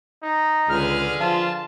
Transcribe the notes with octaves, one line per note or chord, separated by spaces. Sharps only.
D#4
C#2 D3 G#4 B4 F6
F3 F4 A5